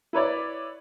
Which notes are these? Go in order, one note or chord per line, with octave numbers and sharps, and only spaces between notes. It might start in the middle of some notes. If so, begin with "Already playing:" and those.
E4 B4 C#5 D5